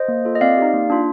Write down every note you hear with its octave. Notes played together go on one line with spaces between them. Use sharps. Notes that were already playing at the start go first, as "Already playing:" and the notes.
Already playing: C5 D#5
A#3
F4 A4
D#5
C4 D5 F5
D#4 G4
A#3
D4 F4